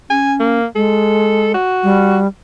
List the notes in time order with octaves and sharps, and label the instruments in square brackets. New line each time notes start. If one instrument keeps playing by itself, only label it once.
[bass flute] C#4 [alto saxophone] G#5
[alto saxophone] A#3
[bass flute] G#3 [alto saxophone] A4
[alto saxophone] F#4
[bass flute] G3